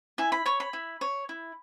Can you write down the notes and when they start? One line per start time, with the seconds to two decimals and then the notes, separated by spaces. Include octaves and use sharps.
0.18 E4 G#5
0.32 B5
0.46 C#5 C#6
0.60 B5
0.73 E4
1.01 C#5
1.29 E4